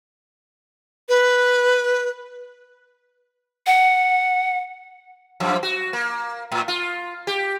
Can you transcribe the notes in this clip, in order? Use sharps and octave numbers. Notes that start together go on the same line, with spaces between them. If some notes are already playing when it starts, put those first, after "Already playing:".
B4
F#5
F#2 F3
F#4
A#3
A2
F4
G4